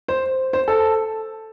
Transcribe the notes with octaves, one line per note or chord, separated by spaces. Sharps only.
C5
C5
A4